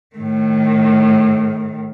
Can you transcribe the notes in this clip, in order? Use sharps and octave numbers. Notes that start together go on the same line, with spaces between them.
A2 D#3